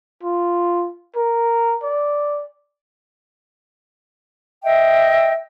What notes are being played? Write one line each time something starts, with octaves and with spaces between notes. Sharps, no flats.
F4
A#4
D5
D#5 E5 G5